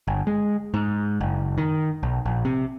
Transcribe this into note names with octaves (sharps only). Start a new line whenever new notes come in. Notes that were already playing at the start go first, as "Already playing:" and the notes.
G1
G#3
G#2
F#1
D#3
B1
A#1
C3